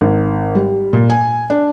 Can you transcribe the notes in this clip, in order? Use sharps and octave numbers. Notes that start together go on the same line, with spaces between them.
G#1
G3
A#2
G#5
D4